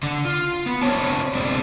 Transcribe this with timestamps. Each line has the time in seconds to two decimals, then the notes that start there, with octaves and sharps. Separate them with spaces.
0.03 D3 D4
0.25 F4
0.66 B3
0.82 C4 D4 F#4 C5 C#5 A5
1.35 E2 B2 G#3 C4 D4